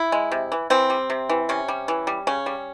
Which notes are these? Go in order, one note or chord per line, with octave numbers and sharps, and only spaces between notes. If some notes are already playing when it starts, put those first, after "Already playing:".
Already playing: E4
G#3
C3
E3
E3 C4
G3
C3
E3
C3 C#4
G3
E3
G3
C#3 C#4
G3